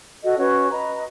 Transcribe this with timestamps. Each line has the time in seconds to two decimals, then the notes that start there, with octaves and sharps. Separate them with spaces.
0.22 F#4 A4 D#5
0.37 C#4 F#4 B4 C#5
0.70 B4 D#5 A#5